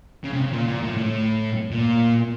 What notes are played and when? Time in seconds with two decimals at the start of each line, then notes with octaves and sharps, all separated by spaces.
0.24 C#3
0.33 C3
0.42 C#3
0.53 A#2
0.68 A#2
0.83 A2
0.97 A2
1.71 A#2